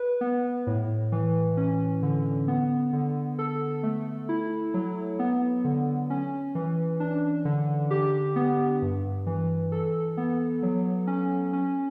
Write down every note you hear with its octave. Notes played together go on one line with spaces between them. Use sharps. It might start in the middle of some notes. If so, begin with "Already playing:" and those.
Already playing: B4
B3
A2
E3
C#4
D3
B3
D3
A4
A3
E4
F#3
B3
D3
C#4
E3
D4
D3
G4
B3
G2
E3
A4
B3
F#3
C#4
C#4